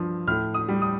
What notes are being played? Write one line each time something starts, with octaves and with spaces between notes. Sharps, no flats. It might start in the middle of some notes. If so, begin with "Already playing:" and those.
Already playing: G2 F3
A2 F6
D#6
G3
D#6